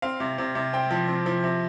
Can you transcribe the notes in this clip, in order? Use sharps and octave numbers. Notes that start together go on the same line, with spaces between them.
C4 F5
C3
C3
C3
C4 G5
F3
C4
F3
C3